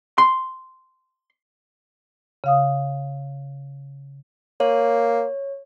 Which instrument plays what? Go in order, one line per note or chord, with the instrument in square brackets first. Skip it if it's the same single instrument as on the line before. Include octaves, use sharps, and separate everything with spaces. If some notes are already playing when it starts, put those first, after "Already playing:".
[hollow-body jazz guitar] C6
[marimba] C#3 F5 D#6
[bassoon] A#3 [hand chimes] C#5